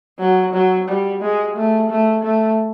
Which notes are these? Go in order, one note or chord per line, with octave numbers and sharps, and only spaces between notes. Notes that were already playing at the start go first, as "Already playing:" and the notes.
F#3
F#3
G3
G#3
A3
A3
A3